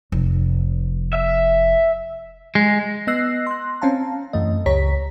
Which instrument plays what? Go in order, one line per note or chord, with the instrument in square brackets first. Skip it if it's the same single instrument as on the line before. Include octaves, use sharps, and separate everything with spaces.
[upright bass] F1
[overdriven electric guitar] E5
[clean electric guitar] G#3
[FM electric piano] B3 D#5 E6 F#6 A#6 C7
C6 F#6
C4 C#4 F5 A5 A#5
F#2 E3 A3 D#5
C#2 G4 C#5 A#5 B6